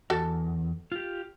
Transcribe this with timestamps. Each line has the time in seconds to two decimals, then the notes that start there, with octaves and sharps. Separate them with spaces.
0.10 E2 F#4 A4 A5
0.92 F4 G4